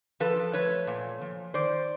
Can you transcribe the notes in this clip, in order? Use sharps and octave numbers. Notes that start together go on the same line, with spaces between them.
F3 A4 B4
A3 B4 C#5
A#2
F3
D#3 C5 D5